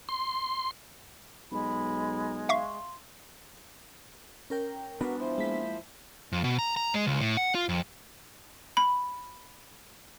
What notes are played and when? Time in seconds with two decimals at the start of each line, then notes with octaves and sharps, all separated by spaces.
0.09 C6
1.52 B1 G#3 B5
2.49 E5 F5 C6 C#6
4.50 C#4 A#4 G5
5.01 B3 D4 F#4 A#4 B4
5.20 F3 E4 C5
5.38 G#3 A#3 B6
6.32 F2
6.44 B2
6.59 A#5
6.77 A#5
6.94 G#3
7.07 C#2
7.21 A2
7.37 F#5
7.55 F4
7.69 F2
8.77 B5